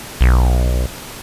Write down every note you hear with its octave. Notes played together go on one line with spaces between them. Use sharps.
B1